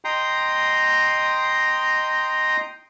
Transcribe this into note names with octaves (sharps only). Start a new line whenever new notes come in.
D#5 G5 A#5 C6